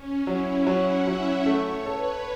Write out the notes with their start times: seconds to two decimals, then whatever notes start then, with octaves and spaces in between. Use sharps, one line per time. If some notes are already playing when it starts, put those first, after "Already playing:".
Already playing: C#4
0.26 F#3 E4
0.66 F#3 F#5
1.07 F#3 E5
1.46 A3 C#5
1.86 A4 B4